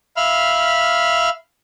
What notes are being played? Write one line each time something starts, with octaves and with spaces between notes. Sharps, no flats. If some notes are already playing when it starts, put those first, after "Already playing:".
E5 F5 B5 F6